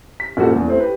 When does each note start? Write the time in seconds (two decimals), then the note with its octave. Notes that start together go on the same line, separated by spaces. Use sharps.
0.20 B6
0.37 F#1 A#2 F3 F#4 A4
0.56 E2
0.68 A3 C4 E4
0.80 G4 B4